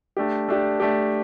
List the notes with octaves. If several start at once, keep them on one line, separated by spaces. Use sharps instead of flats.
A3 D4 G4
A3 D4 G4
A3 D4 G4